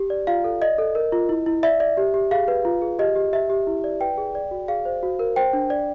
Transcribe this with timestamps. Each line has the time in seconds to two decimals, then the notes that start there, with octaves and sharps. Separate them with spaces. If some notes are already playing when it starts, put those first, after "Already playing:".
Already playing: G4
0.10 D5
0.27 F4 F5
0.44 A4
0.62 D5 D#5
0.78 A4
0.95 A#4
1.12 F4
1.29 E4
1.46 E4
1.63 D5 E5
1.80 D5
1.97 G4
2.14 G4
2.31 G#4 F5
2.48 B4
2.65 F4
2.82 G#4
2.99 G4 D#5
3.15 G4
3.33 G4 E5
3.50 G4
3.67 E4
3.84 D5
4.00 B4 G5
4.18 G#4
4.35 D5
4.51 F#4
4.68 G#4 F5
4.85 C5
5.03 F#4
5.19 A#4
5.36 C5 G5
5.53 D4
5.70 D5